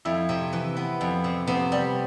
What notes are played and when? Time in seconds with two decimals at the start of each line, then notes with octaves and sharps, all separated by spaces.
0.05 F2 E4
0.29 C3
0.53 E3
0.77 B3
1.01 F2
1.24 C3
1.47 C3 B3
1.72 G3